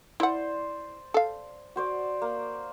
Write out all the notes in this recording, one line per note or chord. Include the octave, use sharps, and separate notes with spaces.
E4 C5 D5 F#5
A4 F5
F#4 C5 D5
A#3